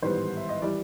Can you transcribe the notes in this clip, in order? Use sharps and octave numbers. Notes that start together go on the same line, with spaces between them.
A1 G#2 D#3 G3 B3 C5
E5
D#5
E3 G3 D5